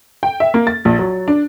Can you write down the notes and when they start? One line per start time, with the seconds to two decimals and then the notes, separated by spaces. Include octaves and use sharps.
0.23 G5
0.40 E5
0.54 A#3
0.67 A6
0.85 A#1
0.99 F#3
1.28 D4